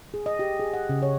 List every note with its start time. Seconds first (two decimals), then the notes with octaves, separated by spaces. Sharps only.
0.14 G#4
0.26 D#5
0.39 G4
0.59 G#4
0.74 F#5
0.89 C#3
1.02 C#5